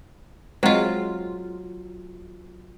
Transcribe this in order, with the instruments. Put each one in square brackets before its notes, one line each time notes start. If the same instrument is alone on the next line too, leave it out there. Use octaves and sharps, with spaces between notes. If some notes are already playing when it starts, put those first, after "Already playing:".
[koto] F#3 F4 [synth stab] G#3 C4